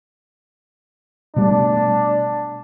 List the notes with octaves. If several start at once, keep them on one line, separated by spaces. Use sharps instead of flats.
B2 G3 A3 D4